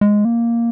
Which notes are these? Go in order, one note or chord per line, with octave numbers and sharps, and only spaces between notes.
G#3
A#3